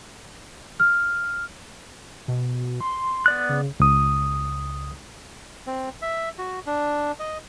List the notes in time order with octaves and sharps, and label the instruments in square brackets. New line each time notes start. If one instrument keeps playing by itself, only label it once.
[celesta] F6
[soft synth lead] B2
C6
[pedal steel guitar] B3 D5 F#6
[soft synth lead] C#3
[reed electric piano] C#2 D#6
[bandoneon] C4
E5
F#4
D4
D#5